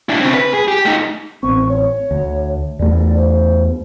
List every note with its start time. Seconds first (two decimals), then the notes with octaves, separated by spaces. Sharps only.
0.09 D4 E4
0.21 C#3 C4
0.34 B4
0.54 G#4
0.68 G4
0.85 A3 D#4
1.43 A1 C4 C#6
1.69 C#5
2.11 D2
2.79 E2 A3 D5
3.17 C5